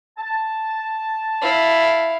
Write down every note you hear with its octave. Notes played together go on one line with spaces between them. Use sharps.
A5
E4 F5